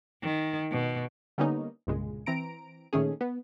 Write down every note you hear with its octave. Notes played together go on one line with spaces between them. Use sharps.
D#3
B2
D3 G3 A#3 B3 C#4 D#4
C2 G2 A#2 C#3 G#3
E3 C4 A#5 D7
A#2 D#3 A3 C#4 G#4
B3